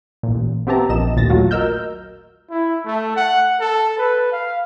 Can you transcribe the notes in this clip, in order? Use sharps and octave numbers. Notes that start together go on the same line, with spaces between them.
A1 A#2
B3 C4 G4 E5 A5 A#5
A#1 A#2 D#5 E7
A1 D#2 A#2 A6 A#6
F#3 A3 F4 F#4
A#4 D#5 E6 F6 G6
E4
A3
F#5
A4
B4
F5